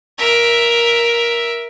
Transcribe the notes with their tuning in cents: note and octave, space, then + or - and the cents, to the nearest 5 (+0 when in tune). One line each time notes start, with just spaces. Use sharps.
A#4 +10 E5 +0